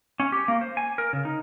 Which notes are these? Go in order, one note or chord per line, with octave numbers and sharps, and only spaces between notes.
C#4
G4
A#3
C5
G#5
A#4
C#3
D#4